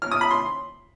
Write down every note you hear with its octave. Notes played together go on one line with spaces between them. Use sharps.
F6
D#6
B5
C6